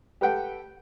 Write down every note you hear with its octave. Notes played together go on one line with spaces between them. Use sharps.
G4 A4 B4 F#5 G5